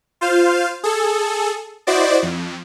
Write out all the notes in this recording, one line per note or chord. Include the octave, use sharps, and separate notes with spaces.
F4 C5 F5
G#4 A4
E4 F#4 C5 D5 D#5
F2